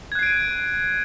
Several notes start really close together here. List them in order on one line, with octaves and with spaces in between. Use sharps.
G#6 F#6 C7 D7 D#7